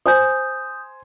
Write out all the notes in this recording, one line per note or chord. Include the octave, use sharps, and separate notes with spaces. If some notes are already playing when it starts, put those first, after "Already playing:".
C5 G#5 D#6 G6